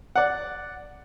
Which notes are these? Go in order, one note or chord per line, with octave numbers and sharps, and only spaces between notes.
D5 F#5